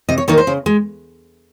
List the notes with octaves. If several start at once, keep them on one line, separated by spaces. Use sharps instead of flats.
C3 D#5
C#5
D#3 A#3 D#4 C#5
C5
C#3
G#3